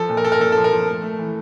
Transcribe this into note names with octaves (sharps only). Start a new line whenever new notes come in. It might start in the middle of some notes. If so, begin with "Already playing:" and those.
Already playing: F3 A4
A#2
A#4
A#2 A4
A#4
A#2 A4
F3 A4
A#4
F3
A3
A3
E3